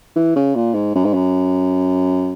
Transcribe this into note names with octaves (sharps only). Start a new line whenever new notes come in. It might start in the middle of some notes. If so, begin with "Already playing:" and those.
E3
C#3
A#2
G#2
F#2
G#2
F#2